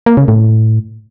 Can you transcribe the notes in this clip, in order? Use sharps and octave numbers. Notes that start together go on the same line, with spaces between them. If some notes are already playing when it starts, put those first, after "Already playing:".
A#3
C#3
A2